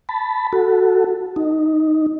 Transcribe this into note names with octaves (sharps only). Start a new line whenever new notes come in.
A5 B5
F#4 A4
D#4